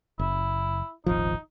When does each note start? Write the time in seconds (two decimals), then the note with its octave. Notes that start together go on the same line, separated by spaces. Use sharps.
0.19 F#1 E4
1.06 D#1 G#1 F3 D#4